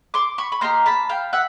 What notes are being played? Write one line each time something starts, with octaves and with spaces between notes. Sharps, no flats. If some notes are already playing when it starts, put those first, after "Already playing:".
C6 D6
B5 C#6
B5
A#3 D#4 G4 A#5 C6
A5 B5
F5 G5
E5 F#5